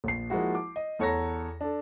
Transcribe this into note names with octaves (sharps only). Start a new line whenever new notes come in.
A#1 C7
F3 G#3 A#3 E4 F#4
D6
D#5
E2 A4 C#5 A#5 A#6
D4 A4